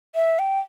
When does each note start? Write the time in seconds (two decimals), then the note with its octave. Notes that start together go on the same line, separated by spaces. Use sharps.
0.15 E5
0.39 G5